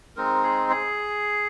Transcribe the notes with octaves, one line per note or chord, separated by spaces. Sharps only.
G#3 C4 D#4 A#4
G#4
G#4